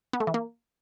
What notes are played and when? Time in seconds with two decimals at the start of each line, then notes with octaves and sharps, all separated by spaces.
0.13 B3
0.20 A3
0.27 E3
0.34 A#3